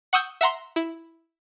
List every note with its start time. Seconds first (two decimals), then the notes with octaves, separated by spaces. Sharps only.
0.13 F#5 C#6 D#6 E6 G6
0.41 E5 F#5 A#5 C6
0.76 E4